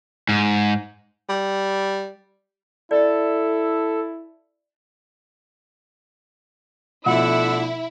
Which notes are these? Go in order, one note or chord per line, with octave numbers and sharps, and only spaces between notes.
G#2
G3
E4 A4 D5
B2 D3 F3 A3 E4 F#5 E6